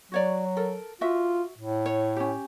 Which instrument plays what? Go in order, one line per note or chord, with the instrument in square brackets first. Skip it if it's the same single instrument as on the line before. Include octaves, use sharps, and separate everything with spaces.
[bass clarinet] F#3 [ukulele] F#4 C#5 D5
[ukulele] A4 A#4
[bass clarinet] F4 [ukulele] F#4 E5
[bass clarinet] A2
[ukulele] C#5
C#4 G4